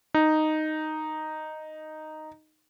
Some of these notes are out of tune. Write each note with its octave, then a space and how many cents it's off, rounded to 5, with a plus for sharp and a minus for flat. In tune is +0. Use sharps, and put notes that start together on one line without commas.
D#4 -5